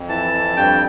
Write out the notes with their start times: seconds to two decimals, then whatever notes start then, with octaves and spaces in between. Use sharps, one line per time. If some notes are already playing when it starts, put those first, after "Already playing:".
Already playing: F2
0.08 E3 A5
0.33 F2
0.57 G2 G5